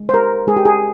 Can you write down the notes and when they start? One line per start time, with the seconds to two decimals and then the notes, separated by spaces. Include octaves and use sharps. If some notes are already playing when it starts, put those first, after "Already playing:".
Already playing: G#3
0.09 C5
0.13 G4 A#4
0.47 G#3 G#4
0.57 G4
0.65 G#4